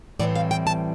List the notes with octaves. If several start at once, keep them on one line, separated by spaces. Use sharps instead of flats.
A2 E3 G3 C4 D5
F5
G5
A5